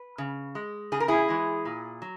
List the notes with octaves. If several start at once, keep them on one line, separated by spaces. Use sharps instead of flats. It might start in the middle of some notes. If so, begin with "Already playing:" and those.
Already playing: B4
C#3
G#3
C#3 G#4
A#4
E4 G#4
E3 G#3
A#2
F#3